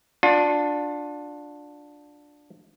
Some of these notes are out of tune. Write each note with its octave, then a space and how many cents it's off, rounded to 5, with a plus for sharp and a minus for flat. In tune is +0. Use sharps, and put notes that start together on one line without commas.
D4 +0 F4 +35